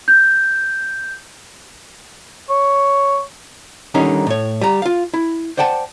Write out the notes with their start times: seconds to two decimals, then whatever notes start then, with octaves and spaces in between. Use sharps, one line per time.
0.08 G6
2.50 C#5
3.94 D3 D#3 G3 C#4 D#4
4.27 A2 C#5
4.61 G3 A#5
4.82 F4 F5
5.14 E4
5.57 C5 D5 F#5 G5 A5